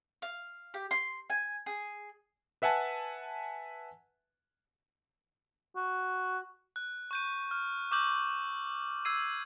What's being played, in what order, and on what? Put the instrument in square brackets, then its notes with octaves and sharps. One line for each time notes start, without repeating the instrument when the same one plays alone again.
[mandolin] F5
G4
C6
G#5
G#4
[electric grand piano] B4 E5 F#5 G#5 A5
[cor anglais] F#4
[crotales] F#6
C#6 G6 D#7
F6
C#6 D6 E6 G6 F#7
E6 G#6 C7 D#7